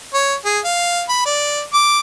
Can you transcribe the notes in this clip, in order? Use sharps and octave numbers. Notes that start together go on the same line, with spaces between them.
C#5
G#4
F5
B5
D5
D6